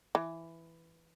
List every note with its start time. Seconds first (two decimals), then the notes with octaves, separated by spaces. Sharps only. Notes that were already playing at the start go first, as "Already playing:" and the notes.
0.15 E3